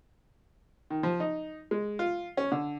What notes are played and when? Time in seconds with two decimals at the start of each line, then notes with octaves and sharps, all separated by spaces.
0.90 D#3
1.03 F3
1.20 D#4
1.71 G#3
1.99 F4
2.37 C#4
2.52 D3